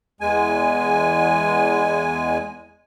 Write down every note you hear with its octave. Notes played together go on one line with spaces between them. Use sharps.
E2 G#3 G#5